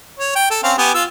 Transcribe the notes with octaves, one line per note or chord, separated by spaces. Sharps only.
C#5
G5
A4
C4 C#4 F5
B3 G4 G#5
F4 E6